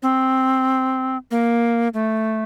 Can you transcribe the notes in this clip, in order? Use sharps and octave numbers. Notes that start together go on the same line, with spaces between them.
C4
A#3
A3